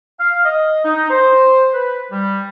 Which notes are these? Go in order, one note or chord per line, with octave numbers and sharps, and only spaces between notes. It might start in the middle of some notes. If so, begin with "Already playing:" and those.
F5
D#5
D#4
C5
B4
G3